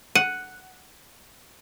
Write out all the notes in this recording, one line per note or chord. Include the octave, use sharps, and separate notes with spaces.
F#5 D#7